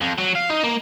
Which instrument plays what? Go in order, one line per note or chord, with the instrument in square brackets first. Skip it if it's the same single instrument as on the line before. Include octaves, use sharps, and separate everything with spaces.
[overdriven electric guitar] F2
F#3
F5
D#4
A#3